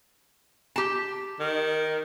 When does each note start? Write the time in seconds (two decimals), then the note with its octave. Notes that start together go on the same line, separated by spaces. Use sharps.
0.76 G4 A5
1.40 D#3